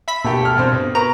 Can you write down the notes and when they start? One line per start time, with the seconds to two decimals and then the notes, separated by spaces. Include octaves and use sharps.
0.08 E5 B5 B6
0.24 B2 A3 A#3 G4
0.41 A4 F6
0.57 G2 C4 C5
0.72 B2
0.95 A#4 B4 A#5 C#6